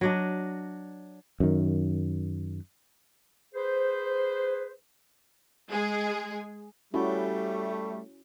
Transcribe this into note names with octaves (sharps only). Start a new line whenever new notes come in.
F#3 D4 D#5
F#2 D#3
G#4 B4 C5
G#3 G#4
G3 A3 C#4 E4 F#4